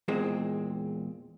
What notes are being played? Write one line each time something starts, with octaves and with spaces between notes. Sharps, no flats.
E2 A#2 G#3 C4